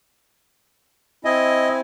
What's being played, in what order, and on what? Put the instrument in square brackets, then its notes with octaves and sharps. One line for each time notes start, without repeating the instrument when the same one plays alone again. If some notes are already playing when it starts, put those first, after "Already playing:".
[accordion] C4 E4 G#5 [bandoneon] D#5